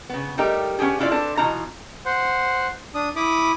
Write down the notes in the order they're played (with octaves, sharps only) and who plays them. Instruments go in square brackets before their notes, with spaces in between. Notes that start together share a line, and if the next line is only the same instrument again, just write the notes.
[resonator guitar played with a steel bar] C#3 B3
G3 A3 D#4 G4 A#4
B3 C#4 D4 G4 G#4
C#4 E4 F4 G#4 D5
C4 D4 A4 B4
B2 E3 D#4 F4 A5 A#5
[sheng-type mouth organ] C5 F#5
D4 D#6
E4 B5 D6 D#6